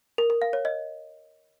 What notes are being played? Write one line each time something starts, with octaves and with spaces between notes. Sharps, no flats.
A#4
A#4
F5
C#5
D#5